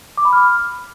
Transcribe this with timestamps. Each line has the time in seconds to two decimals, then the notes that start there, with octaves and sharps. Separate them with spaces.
0.17 D6
0.25 B5
0.33 F6